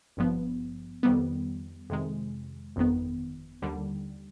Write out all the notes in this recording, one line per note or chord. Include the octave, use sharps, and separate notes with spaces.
G#1 G2 F3 B3
F2 D#3 G3 B3
F2 C3 D#3 G#3
G1 F2 D#3 B3
D#2 D3 G3